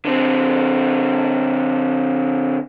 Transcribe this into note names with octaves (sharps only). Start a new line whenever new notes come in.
D3 C4